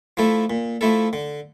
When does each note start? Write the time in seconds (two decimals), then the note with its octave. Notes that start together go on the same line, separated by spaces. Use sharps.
0.17 F3 A3 E4 A4
0.50 A#2
0.81 F3 A3 E4 A4
1.13 D3